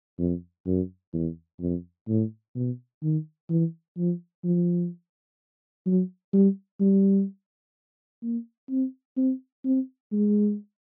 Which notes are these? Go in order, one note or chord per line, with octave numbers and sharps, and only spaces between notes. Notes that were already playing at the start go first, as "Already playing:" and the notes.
F2
F#2
E2
F2
A2
B2
D#3
E3
F3
F3
F#3
G3
G3
A#3
C4
C4
C4
G#3